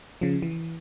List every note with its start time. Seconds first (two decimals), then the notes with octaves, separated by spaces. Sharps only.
0.21 C#3 F3
0.42 E3